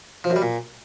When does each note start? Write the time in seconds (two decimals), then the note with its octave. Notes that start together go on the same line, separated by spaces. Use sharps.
0.24 F3
0.30 F#2
0.36 G3
0.42 A#2